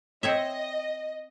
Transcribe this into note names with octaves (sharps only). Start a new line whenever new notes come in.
C4 C#5 D#5 E5